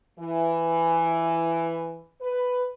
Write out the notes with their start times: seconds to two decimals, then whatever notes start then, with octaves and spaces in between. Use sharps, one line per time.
0.19 E3
2.21 B4